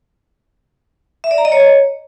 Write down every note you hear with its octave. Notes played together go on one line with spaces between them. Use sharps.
E5
D5
A#5
D#5
C#5